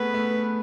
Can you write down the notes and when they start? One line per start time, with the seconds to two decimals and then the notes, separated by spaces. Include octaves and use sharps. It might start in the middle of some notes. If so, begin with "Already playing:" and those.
Already playing: A3 B3 G#4 B4
0.14 A3